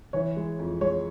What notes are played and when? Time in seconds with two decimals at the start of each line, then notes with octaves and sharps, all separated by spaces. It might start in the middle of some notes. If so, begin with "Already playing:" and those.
0.13 E3 C#5
0.36 G#3
0.59 F2
0.81 G#3 C#5